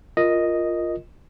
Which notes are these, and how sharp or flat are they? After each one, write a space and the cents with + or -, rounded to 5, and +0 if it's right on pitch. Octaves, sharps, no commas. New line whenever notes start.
F4 +0 A#4 +0 D#5 +0